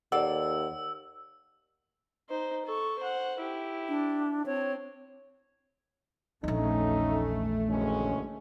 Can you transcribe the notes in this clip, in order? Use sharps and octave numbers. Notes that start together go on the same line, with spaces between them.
D#2 A4 D5 F#5 E6
D#4 C5
A4 C#6
C5 F#5
E4 G4
D4
C4 C#5
A#1 E2 A3 C#4 D#4
F#1 D3 G#3 C#4